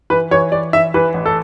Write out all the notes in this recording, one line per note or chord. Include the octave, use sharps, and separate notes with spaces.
E3 B4
E3 C#5
E3 D5
E3 E5
E3 B4
A1
A4